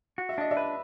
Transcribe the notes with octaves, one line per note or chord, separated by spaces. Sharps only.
F#4
E5
D4 D#5
D5 E5
B4